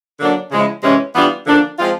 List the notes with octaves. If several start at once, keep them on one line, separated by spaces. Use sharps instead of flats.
D3 F#3 A#3 D4
C#3 F3 G#3 C#4 E4
C3 E3 G#3 C#4
E3 G3 B3 D4 F4
D3 F3 A#3 D4
F3 G#3 C4 F4